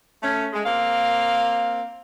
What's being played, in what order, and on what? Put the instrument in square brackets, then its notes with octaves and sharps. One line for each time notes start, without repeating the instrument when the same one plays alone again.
[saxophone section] A3 C#4
G#3
A#3 C4 F5